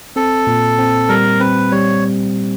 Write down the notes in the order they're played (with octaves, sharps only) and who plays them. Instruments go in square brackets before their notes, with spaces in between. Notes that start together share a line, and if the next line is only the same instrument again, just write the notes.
[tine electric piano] C4 [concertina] A4
[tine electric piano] A#2
C4
[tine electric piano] G3 [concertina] A#4
[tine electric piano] C4 [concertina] B4
[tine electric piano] G3 [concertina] C#5